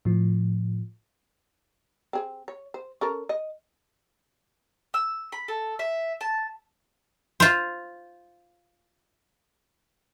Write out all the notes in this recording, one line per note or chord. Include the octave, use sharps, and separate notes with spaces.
A2 F3
C4 G#4
C#5
C5
C#4 A4 A#4
D#5
E6
B5
A4
E5
A5
F4 C5